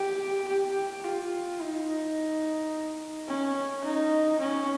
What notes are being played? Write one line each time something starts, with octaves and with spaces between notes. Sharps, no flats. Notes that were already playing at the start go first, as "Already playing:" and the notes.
Already playing: G4
G4
F4
D#4
C#4
D#4
C#4